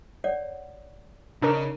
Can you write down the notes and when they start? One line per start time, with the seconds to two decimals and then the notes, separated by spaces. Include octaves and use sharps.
0.24 C#5 D5 F#5
1.42 C#3 D4 D#4 A#4